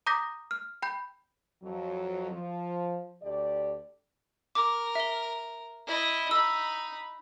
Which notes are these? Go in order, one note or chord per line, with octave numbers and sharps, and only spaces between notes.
A#5 D6 D#6 G6 A#6 B6
F6
G5 B5 G6
F2 F#3
F3
D2 G4 D5
A#4 D6
E5 G7
E4 D#5
D#4 B5 E6